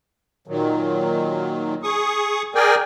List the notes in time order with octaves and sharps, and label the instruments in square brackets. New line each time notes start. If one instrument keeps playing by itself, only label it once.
[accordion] A#2 D#3 F#3
G#4 C#6 D#6
G#4 A#4 D5 G5 G#5